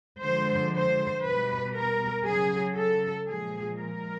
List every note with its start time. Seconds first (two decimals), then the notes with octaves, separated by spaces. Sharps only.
0.21 D3 F3 G#3 C5
0.73 C5
1.23 B2 G3 B4
1.74 A#4
2.25 C#3 F#3 G#4
2.76 A4
3.26 A#2 F3 G#3 G#4
3.78 A#4